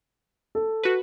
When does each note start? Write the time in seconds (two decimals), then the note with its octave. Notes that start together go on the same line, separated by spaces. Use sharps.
0.55 A4
0.84 F#4 B4